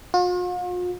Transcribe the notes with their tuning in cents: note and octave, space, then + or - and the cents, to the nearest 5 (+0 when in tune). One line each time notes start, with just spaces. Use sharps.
F4 +45